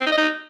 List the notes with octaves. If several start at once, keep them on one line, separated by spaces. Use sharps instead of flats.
C4
D#4
D#5
D#4